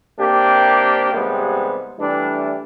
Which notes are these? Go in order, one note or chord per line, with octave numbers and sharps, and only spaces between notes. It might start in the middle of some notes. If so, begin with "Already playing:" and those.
C3 A#3 D4 G4
D#2 C3 G3 G#3 B3
E3 G3 A3 D4